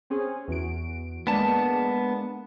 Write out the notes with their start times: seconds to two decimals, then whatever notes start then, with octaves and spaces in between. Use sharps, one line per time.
0.10 C4 C#4 G#4
0.48 E2 F#4 D7
1.27 G#3 A#3 B3 D4 A5